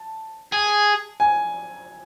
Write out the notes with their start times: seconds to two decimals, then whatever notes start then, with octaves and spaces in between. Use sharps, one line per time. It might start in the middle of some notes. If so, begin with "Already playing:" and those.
Already playing: A5
0.53 G#4
1.20 G#5